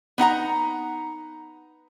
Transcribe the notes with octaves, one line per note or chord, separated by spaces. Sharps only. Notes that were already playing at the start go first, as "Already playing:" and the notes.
B3 D#4 F#5 A#5